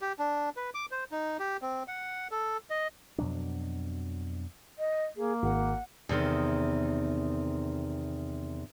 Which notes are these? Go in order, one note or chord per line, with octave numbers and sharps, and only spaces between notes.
G4
D4
B4
D6
C5
D#4
G4
C4
F#5
A4
D#5
F2 B2 F#3 D4
D#5
A#3 G#4
G#1 F#5
E2 C3 D#3